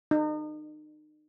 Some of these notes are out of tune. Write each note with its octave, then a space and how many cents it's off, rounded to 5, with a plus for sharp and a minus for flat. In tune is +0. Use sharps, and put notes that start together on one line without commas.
D#4 -35